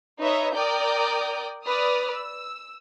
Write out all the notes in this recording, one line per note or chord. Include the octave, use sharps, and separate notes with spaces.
D#4 B4 C#5 D#5 E5
A#4 D5 G5 D#6 G6
B4 D5 D#6 F6
E6